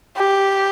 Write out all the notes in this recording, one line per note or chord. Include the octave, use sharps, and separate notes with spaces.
G4